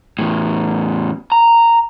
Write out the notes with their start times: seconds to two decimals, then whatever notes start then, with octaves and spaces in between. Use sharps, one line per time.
0.19 E2 A2
1.32 A#5